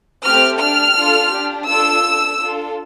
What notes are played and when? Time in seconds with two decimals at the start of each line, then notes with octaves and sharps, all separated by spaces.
0.25 A3 C4 G4 F6
0.60 D4 G4 F6
0.96 D4 F4 A4
1.32 D4 G4
1.67 D4 F4 A4 E6
2.04 D4 A4
2.39 D4 F4 A4